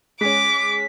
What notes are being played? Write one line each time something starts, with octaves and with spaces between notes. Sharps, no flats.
G#3 C#4 D6 B6